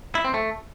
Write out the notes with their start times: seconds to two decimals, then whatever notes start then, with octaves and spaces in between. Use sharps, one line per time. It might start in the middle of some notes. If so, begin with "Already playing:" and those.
0.15 E4
0.25 C4
0.34 A3